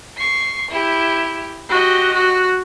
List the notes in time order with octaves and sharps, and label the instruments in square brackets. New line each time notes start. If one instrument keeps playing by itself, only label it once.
[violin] C#6 C7
E4 G4
[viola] F#4 [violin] G4 D#5
[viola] F#4